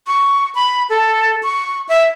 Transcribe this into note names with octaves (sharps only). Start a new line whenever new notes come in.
C#6
B5
A4
C#6
E5